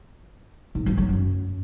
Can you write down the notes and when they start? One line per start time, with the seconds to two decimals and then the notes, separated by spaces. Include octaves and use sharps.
0.75 G#2
0.86 F#3
0.98 F#3
1.09 F#2